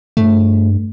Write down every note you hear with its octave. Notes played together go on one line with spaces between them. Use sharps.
G2 A3